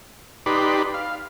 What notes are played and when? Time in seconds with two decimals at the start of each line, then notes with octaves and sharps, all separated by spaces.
0.46 D#4 G4 B4 D5 B5 C6
0.94 F5